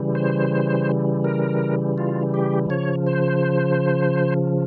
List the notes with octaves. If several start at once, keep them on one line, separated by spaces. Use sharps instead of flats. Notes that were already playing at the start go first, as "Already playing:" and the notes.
Already playing: C#3 E3 G3
C5
A#4
F4
G4
C#3 F3 C#5
C5